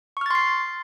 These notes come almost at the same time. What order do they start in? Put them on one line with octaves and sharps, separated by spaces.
C#6 F6 A6 C6 C7